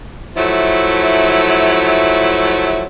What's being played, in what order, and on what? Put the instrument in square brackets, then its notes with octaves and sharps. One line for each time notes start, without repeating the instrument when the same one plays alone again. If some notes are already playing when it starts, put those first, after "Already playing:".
[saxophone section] F3 F#3 A3 E4